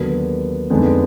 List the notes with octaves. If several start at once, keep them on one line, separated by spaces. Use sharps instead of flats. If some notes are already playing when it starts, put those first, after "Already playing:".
Already playing: D#2 D3 F#3 B3
F2 D3 G#3 B3 D#4